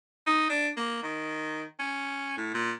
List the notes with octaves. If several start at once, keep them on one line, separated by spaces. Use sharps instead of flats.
D#4
D4
A#3
D#3
C#4
A2
A#2